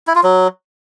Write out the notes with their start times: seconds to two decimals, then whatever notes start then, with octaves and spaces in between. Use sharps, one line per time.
0.07 E4
0.15 F4
0.23 F#3